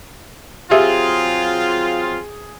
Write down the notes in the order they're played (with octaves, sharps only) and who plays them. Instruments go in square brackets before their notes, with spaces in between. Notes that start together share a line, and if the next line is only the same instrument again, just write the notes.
[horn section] F#3 C4 F4 [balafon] G4 E5 [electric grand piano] G#4